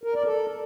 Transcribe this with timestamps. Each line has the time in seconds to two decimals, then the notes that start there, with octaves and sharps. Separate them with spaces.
0.04 A#4
0.15 D5
0.26 A4